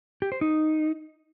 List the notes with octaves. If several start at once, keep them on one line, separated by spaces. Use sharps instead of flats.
G4
C5
D#4